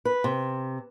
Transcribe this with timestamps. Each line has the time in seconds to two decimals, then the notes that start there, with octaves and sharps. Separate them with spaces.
0.05 B4
0.24 C3